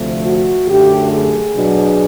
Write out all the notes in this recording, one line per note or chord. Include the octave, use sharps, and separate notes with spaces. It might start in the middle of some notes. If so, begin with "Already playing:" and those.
Already playing: D2 C3 F3 A3
F#4
F#2 D3 F#3 A3 G4
G#4
B2 F#3 B3 D4